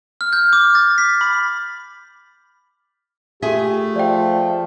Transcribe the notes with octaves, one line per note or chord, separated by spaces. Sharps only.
F6
G6
D6
A6
B6
B5
A3 F4 G4 G#4 E5
F3 D5 G5